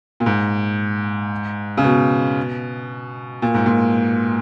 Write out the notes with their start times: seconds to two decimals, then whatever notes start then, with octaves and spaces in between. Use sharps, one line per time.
0.20 A#2
0.26 G#2
1.78 C#3
1.84 B2
3.42 A#2
3.54 G#2
3.66 A#2